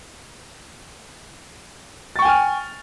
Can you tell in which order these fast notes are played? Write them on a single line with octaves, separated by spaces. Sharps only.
A6 C#6 G5 G#5 F6